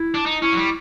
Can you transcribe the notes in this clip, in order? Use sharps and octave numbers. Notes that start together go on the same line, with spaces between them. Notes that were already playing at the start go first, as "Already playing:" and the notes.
Already playing: E4
D4
D#4
C#4 E4
F#3
G3